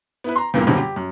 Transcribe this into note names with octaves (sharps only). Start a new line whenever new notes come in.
B3 E4 B4
A#5 C6
E2 G2 A#2 G3 A#3
A#1 F#2 B2 D3 G3
G4
F#2